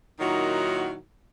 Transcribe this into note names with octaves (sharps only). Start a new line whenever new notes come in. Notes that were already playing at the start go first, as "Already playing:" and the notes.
A#2 D#3 F#3 D#4 E4 F#4